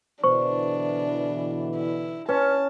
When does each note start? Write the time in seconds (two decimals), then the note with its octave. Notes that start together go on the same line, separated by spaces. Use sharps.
0.24 B2 D3 E3 D4 C5 C#6
1.76 E4
2.29 C#4 B4 A5